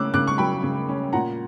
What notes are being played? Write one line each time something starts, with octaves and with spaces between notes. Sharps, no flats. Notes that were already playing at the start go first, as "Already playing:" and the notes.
Already playing: C#3 C#4 D6 E6 F#6
C#3 D6 F#6
C#6
F#3 G5 B5
C#3
C#4
A#2 F#5 A#5